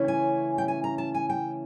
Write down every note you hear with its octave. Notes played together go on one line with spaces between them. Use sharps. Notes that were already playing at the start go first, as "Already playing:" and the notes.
Already playing: C#3 E3 A3 C#4 E4
G#5
G5
G#5
A#5
A5
G#5
G5